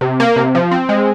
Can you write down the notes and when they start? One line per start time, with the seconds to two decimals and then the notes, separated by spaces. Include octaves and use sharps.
0.01 C3
0.20 A#3
0.36 C3
0.55 F3
0.71 C4
0.89 G#3